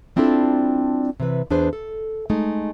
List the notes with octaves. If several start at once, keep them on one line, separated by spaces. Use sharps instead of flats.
G3 C4 D4 E4 F4 A4
C3 E3 B4
E2 D4 G#4 B4 C5
A4
G#3 A3 D#4